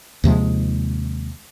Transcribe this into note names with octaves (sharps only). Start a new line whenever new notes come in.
D#2 C3 F3 G#3